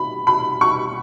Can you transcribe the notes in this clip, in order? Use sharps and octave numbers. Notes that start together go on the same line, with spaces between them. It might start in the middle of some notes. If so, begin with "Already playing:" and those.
Already playing: B5
B5
C#6